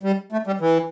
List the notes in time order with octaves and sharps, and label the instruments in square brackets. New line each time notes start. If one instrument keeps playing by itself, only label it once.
[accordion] G3
A3
G3
E3